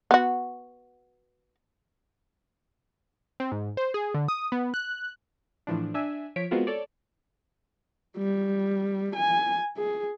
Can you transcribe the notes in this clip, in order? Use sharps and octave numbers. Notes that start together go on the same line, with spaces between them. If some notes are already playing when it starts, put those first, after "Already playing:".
B3 F#4
C4
G#2
C5
G#4
D3
D#6
B3
F#6
A2 E3 F3 D4
D4 E5 G#5
F3 C#5 B6 D7
G#3 B3 C4 F4 F#4 A#4
A4 C#5 D5
G3
G#5
G#4